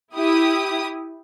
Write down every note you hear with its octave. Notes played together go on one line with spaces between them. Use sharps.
E4 G4 D#6